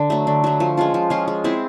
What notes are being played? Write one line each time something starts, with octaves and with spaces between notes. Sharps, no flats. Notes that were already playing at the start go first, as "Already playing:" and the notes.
Already playing: D3
F#3 A3
D3
F#3 A3
F3
G#3 C#4 F4
F3
G#3 C#4 F4
G#3
C4 E4 G#4